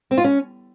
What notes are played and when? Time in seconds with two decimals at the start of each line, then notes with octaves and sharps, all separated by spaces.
0.11 C4
0.18 F4
0.24 C#4